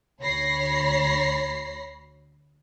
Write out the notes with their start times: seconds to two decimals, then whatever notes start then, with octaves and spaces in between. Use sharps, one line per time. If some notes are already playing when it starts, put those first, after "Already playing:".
0.20 D2 C#5 B5 A#6 C7